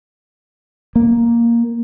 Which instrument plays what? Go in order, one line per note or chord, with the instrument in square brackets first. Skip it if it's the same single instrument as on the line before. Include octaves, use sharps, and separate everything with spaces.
[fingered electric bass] A#3